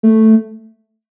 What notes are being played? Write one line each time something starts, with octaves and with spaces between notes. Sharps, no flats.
A3